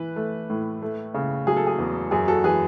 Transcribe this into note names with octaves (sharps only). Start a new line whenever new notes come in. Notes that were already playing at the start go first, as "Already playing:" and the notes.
Already playing: E3 B4
A3
A2
A3
C#3
F#3 G#4
A4
G#4
E2
F#2 G#4
F#4 A4
E3 G#4 B4